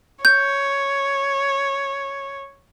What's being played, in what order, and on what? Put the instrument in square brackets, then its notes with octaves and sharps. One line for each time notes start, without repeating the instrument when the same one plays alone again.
[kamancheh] C#5 [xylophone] G6